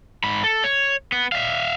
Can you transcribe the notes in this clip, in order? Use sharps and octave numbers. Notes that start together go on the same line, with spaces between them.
G#2 B5
A4
C#5
B3
E5 F5